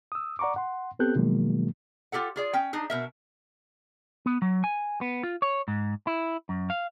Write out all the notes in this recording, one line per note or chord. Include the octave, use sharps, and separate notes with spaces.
D#6 E6
D5 F#5 A#5 C#6 D6
F#5 C6
B3 C4 G4 A4 F#6 G6
B2 D#3 F3 F#3 G#3 A#3
F4 G4 A4 F#5
F4 G#4 D5
C#4 G5
D4 D#4 G#4
B2 A#4 E5
B3
F#3
G#5
B3
F4
C#5
G#2
E4
F#2
F5